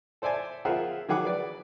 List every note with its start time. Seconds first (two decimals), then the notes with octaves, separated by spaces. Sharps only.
0.22 A4 C5 D5 E5 G#5
0.65 F4 G#4 A#4 C5 E5 F#5
1.09 D#3 F#3 G#4 F#5 D6
1.25 B4 D5